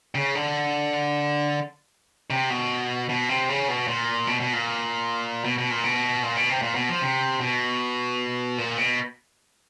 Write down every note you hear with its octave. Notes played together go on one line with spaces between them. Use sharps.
C#3
D3
C3
B2
B2
C3
C#3
B2
A#2
B2
B2
A#2
B2
B2
A#2
B2
A#2
B2
C3
A#2
B2
F3
C3
B2
A#2
B2